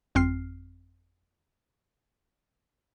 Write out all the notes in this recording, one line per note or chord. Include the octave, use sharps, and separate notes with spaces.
G1 F2 C4 F6 C7